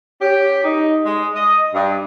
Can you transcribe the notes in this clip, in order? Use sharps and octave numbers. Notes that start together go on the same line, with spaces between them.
C#4 G4
D#4
G#3
D#5
G2